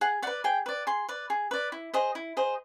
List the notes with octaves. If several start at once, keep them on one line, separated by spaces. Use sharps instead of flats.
G#4 F#5
B4 D5 F#5
G#4 G5
B4 D5
G#4 C6
B4 D5
G#4
B4 D5
E4
G#4 C5 D#5
E4
G#4 C5 D#5